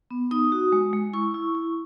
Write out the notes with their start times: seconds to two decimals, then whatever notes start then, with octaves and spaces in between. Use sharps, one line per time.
0.11 B3
0.31 D#4 D#6
0.52 F#4
0.72 G#3
0.93 G#3
1.13 E4 C#6
1.34 E4
1.55 E4